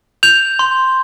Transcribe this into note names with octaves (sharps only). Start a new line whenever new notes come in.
G6 F7
C6